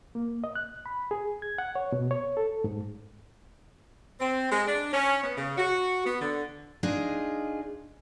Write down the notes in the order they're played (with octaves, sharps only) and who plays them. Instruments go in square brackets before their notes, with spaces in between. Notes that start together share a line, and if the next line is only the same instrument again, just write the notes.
[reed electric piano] A#3
D#5
F#6
B5
G#4
G#6
F#5
C#5
B2
C#5
A4
G#2
[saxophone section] C4
G#3
D4
C#4
B3
C#3
F#4
B3
D3
[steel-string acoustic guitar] D4 D#4 F4 G#4 D#5